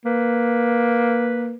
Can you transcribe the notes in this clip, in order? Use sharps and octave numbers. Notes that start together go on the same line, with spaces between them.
A#3 B4